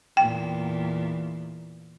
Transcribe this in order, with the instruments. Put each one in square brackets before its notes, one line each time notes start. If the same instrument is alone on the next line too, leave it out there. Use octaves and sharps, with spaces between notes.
[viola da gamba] E2 A#2 [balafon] G5